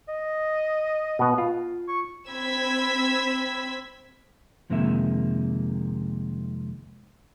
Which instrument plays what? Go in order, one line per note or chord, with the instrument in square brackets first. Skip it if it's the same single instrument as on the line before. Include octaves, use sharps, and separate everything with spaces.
[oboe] D#5
[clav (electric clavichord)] B2 B3
F4
[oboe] C#6
[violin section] C4 B5 E6 G#6 B6
[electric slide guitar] F2 C3 D#3 G#3 A#3 E5